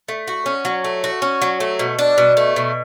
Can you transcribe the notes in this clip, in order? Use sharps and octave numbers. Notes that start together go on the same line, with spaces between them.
A3
F#4
C#4
F#3
A3
F#4
C#4
F#3
A3
B2
D4
B2
A3
B2